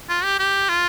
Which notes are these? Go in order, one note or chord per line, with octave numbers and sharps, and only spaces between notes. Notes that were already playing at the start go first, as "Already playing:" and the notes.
F4
G4
G4
F4